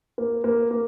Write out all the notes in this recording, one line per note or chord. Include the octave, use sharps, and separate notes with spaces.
A#3
A#3
A#3